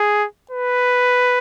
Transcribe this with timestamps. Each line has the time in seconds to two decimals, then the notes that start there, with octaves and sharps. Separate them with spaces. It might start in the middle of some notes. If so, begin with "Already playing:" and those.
Already playing: G#4
0.51 B4